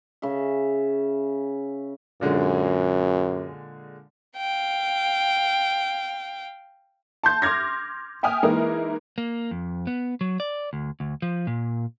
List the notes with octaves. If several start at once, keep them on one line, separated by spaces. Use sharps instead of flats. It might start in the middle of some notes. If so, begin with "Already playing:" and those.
C#3 E5
F#2 A#2 D3 G#3
F5 G5
A5 C6 G6
C6 D6 F6 G#6 A#6
E5 G5 G#5 D#6 F6
E3 G#3 A#3 D#4 E4 A#4
A#3
F2
B3
F#3
D5
D2
D2
F3
A#2